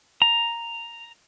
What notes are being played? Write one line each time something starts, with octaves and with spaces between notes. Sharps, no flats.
A#5